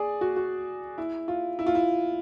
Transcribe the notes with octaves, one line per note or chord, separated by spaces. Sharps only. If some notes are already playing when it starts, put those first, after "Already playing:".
Already playing: G#4 D5
F#4
F#4
E4
F4
E4
F4
E4